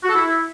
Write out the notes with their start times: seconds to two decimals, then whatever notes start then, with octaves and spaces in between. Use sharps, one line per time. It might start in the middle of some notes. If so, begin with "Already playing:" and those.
0.04 F#4
0.09 A4
0.15 E4